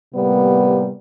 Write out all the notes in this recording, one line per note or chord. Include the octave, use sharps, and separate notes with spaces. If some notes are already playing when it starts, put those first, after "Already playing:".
A2 C3 G3 A#3 B3